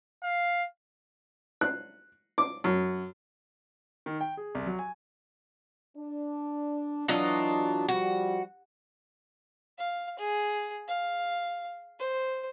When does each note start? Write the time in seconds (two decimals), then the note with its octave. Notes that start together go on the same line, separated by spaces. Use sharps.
0.23 F5
1.61 F#6
2.38 D6
2.64 F#2
4.06 D#3
4.21 G5
4.37 G#4
4.55 C2
4.67 F#3
4.79 G#5
5.97 D4
7.08 E3 F#3 D4 F4 D#5
7.88 F3 G3 F#4
9.78 F5
10.19 G#4
10.88 F5
11.99 C5